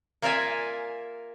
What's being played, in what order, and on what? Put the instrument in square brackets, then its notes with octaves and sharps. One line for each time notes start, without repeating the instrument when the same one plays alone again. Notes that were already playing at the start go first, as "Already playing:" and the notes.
[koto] A#3 F4 A#4 D5 E5 G#5